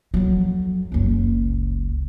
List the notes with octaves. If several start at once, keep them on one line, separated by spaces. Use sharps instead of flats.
F2 F#3
F#1 C#2